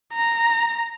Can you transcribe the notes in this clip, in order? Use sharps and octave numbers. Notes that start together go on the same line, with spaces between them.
A#5